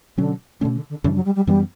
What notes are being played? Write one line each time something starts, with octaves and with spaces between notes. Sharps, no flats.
B2 D3 F#3 C#4
B2 D3 A3 C#4
D3
D3
F#2 C#3 E3 G3 D4
F#3
G3
G3
F#2 E3 G3 B3